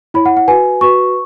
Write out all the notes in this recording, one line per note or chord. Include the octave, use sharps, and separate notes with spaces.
E4 C#5 B5
F#5
F#5
F#4 B4 G#5
F#4 B4 C#6